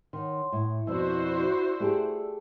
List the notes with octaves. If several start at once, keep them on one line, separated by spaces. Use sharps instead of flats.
D#3 C#5 F#5 C6
A2
F2 B2 E4 F#4 C5 D5 E6
A3 G4 G#4